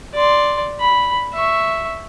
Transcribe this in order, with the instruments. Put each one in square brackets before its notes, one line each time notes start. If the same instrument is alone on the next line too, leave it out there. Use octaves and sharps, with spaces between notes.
[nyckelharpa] D5 C6
B5
E5 C#6